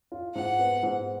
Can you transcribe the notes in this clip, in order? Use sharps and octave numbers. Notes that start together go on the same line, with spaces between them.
F4
G#2 F#5
B3
G#2